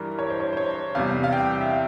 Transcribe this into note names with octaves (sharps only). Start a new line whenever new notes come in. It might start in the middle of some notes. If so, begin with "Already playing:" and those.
Already playing: G2 E3 G3 A#4
C#5
C5
C#5
C5
C#5
E2 C3 G3 F5
F5
G5
E5
F5